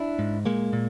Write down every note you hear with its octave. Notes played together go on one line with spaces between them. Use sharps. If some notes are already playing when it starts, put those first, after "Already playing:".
Already playing: D4 E4
G#2
A#2 G#3 A#3
A#2